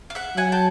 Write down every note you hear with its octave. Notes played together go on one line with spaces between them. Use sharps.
F5
E5 F#5
F#3 F#5 G#5
G5 A5